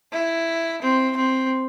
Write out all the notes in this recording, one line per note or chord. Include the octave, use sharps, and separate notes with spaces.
E4
C4
C4